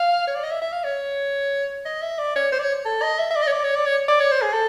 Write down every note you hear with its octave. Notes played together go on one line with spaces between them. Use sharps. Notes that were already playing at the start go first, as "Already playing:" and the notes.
Already playing: F5
C#5
D5
D#5
E5
E5
F5
C#5
D#5
E5
D5
C#5
C5
D5
C#5
A4
D#5
E5
E5
D5
D#5
C#5
D5
C#5
D5
C#5
D5
C#5
C5
G#4
A4